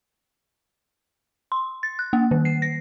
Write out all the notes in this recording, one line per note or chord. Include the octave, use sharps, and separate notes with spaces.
C6
A6
F#6
A#3
D#3
C7
A#6